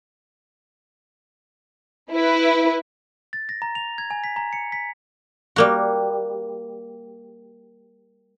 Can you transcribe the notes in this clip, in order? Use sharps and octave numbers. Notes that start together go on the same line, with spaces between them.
E4 B4
A6
A#6
A#5
F7
G#6
G#5
B6
A#5
C#7
B6
G3 A#3 F#4